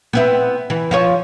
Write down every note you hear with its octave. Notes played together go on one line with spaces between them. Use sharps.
B3 C4 E4
E3
F3 F4 C#5